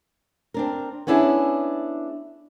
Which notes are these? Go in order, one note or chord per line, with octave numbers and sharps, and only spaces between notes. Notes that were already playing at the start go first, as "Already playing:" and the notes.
C4 D4 A#4
B3 C#4 D4 E4 G4 G#4